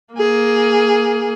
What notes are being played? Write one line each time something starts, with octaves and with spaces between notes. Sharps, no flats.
A#3 G#4